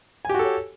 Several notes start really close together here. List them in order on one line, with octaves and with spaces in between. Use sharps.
G#5 G4 F#4 A4 C#5